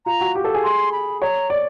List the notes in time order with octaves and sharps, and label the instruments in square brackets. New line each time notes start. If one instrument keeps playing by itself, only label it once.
[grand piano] F4 [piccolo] A#5
[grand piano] F#4
G4
A4
G#4
[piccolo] C6
B5
[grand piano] C#5 [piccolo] A#5
[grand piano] D5